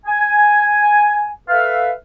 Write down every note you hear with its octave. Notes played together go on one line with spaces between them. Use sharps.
G#5
A4 B4 E5 F5